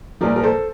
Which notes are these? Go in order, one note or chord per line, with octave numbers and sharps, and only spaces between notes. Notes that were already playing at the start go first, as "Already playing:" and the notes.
C2 A#2 F3 A#4 D5
A#4
A4 C5